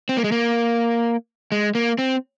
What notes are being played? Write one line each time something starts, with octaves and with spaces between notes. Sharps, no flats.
C4
A#3
G#3
A#3
G#3
A#3
C4